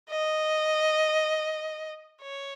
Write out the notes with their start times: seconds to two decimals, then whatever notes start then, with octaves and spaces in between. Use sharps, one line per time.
0.10 D#5
2.21 C#5